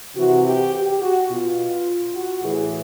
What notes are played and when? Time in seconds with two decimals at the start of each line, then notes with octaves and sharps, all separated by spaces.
0.16 C3 E3 F#4
0.45 G4
0.74 G4
1.02 F#4
1.30 B2 F4
2.15 F#4
2.44 A2 E3 G#4